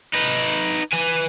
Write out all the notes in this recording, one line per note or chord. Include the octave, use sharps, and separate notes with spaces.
D#4 B4
B4 G#5